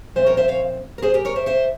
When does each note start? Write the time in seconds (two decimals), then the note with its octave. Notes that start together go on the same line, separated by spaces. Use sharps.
0.15 A#2 F3 C4 C5 E5
0.26 A#4 C#5
0.37 C5 E5
0.48 C#5 F5
0.98 A#4
1.03 G#4 C5
1.14 G4 A#4
1.25 A#4 C#5
1.36 C5 E5
1.46 C5 E5